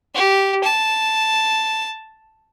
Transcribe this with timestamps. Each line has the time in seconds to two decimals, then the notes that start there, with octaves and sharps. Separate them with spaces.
0.14 G4
0.64 A5